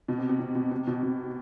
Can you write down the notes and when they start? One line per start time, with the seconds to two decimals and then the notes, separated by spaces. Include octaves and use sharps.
0.08 B2
0.18 C3
0.29 C3
0.40 B2
0.55 B2
0.71 C3
0.87 B2
1.03 B2